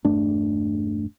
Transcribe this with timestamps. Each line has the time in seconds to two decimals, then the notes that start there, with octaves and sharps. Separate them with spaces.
0.05 E1 G2 A3 D4